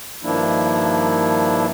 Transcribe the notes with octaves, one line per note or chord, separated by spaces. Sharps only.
G2 D#3 F3 A#3 D4 E4